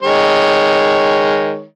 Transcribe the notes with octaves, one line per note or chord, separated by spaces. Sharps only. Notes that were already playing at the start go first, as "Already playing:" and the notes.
D#3 G#3 C#5